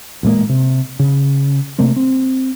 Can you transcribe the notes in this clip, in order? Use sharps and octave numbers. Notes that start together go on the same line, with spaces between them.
A1 A#2 G#3 A#3
C3
C#3
C3 A3 A#3 C4
C4